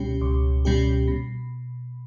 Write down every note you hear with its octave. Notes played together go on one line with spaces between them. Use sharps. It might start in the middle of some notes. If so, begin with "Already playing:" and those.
Already playing: C#2 B2 G3 C#4 G4
C#2
B2 G3 C#4 G4
B2